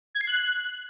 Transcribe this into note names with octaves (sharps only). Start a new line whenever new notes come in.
G#6
C7
F#6